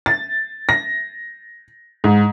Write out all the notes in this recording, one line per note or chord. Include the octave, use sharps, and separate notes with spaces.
A6
A#6
G#2